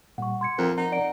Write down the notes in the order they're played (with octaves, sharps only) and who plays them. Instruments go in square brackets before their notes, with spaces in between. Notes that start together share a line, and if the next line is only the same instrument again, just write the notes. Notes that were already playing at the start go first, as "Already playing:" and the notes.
[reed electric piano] A#2 G3 [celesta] F#5 C#6
[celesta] C6 G#6 C#7
[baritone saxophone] F2 [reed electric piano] F3 C4 A#4
[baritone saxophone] D#4 [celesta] F#5
[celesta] D5 F#5 D7